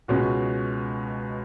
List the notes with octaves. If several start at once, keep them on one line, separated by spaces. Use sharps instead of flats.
C#2 B2 G#3 C#4 F#4